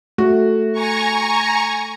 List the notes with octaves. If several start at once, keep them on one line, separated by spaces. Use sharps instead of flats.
A3 F#4
G#5 A#5 C#6